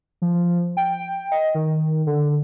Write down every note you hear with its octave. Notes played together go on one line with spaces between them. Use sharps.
F3
G5
D#5
D#3
D3